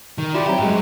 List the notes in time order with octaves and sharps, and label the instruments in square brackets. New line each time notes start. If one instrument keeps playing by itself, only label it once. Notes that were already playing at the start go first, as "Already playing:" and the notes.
[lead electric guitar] D#3
[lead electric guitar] E4 G4 [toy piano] F4 C6 [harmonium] D5
[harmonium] F#3 C4 [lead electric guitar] G4 [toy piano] E5 G5 A#5
[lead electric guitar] G2 F#3 [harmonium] G#3 [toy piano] G5